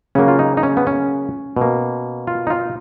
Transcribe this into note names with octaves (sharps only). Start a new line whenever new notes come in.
C#3 F#3 A#3 C#4
F4
D#4
D#4
C#4
B3
C#4
B2 A#3
F4
D#4
F4